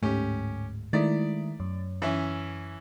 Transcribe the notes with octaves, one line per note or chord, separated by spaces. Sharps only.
D1 G#2 A3 C#4 G4
D#3 G#3 A3 E4 D5
F#2
E3 C#4 E5